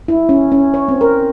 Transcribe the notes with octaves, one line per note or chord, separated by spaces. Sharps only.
E4
C#4
C#4
C#5
C4
A#4